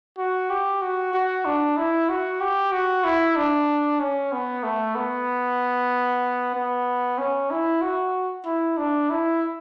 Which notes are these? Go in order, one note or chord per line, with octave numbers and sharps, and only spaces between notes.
F#4
G4
F#4
F#4
D4
E4
F#4
G4
F#4
E4
D4
C#4
B3
A3
B3
B3
C#4
E4
F#4
E4
D4
E4